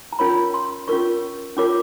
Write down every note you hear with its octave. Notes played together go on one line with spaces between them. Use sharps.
A#5
C#4 F4 A#4 C#5 B5
C6
C#4 F4 A#4 C#5 C#6
C#4 F4 A#4 C#5 D6